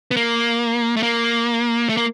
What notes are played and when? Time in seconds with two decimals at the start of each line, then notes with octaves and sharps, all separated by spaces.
0.11 B3
0.17 A#3
0.97 A3
1.03 A#3
1.89 A3
1.97 A#3